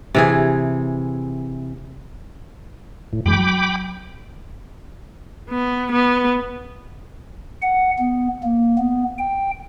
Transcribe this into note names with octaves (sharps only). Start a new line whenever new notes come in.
C3 E3 G#4
A2
F#2 E3 G#3 G5 B5 D6
F#3
B3
B3
F#5
B3
A#3
B3
G5